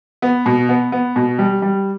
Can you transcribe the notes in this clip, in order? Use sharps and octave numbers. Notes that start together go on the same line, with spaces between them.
B3
B2
B3
B3
B2
G3
G3